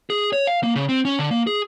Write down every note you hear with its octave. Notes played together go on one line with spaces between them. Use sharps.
G#4
C#5
F5
A#3
C#3
C4
C#4
D3
A#3
G#4